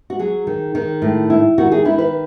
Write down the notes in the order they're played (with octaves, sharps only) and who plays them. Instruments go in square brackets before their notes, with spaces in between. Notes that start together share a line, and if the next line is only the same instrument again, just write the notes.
[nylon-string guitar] F#4
F#3 G#4
D#3
D#3
A2
E4
D#3 F#4
G#4
D#3 E4
B4